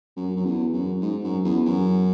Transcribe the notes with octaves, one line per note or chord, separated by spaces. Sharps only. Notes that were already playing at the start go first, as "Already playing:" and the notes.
F#2
F#2
E2
F#2
G#2
F#2
E2
F#2